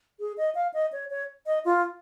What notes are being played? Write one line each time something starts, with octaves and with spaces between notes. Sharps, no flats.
G#4
D#5
F5
D#5
C#5
C#5
D#5
F4